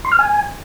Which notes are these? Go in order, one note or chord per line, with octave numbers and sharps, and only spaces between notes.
C6
F6
G#5